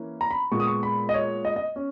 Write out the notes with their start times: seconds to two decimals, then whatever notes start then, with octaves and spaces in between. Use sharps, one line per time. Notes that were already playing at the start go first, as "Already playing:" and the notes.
Already playing: E3 A#3 C#4
0.21 A#5
0.31 B5
0.52 A#2 G#3 B3 C#6
0.60 D#6
0.67 C#6
0.83 B5
1.09 D#5
1.14 C#5
1.45 D#5
1.56 D#5
1.76 C#4